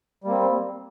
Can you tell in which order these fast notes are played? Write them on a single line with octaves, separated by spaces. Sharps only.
G3 A#3 C4